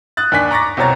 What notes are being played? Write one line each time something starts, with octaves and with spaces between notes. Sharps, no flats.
D#6 F#6 A6
D#2 D4 G#5 B6
A#5 C#6 D6 A6 A#6
C2 B2 C4 C#5 A#5 A6